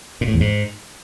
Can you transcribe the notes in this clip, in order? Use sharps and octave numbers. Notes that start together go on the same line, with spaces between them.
A#2
A2
E2
G#2